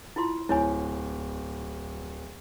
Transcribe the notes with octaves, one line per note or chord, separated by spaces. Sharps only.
E4 F4 C6
D1 E4 C#5 G#5